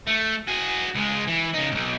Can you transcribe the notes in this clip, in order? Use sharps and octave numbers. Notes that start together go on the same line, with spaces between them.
A3
F#4 G#4
C#2 G#3
E3
C#3 D#4
B1 G#2